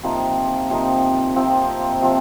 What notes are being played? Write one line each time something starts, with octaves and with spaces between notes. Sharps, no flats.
C3 F3 A#3 D#4
C3 F3 A#3 D#4
C3 F3 C4
C3 F3 C4